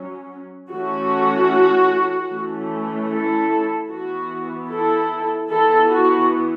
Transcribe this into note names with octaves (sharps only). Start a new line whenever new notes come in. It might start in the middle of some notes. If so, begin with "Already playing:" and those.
Already playing: F#3 C#4
E3 A3 C#4 F#4
E3 A3 C#4
E4 A4
E3 B3 F#4
E4 A4
E3 B3 E4 A4
F#4